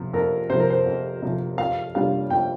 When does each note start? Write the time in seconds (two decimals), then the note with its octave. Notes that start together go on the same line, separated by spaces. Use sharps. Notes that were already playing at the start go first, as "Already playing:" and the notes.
Already playing: F2 C3 F3
0.13 F2 A#4
0.50 C3 F3 C5
0.60 A#4
0.70 C5
0.86 F2
1.22 C3 F3
1.58 F2 F5
1.95 C3 G3 D4 F4 F5
2.30 F2 G5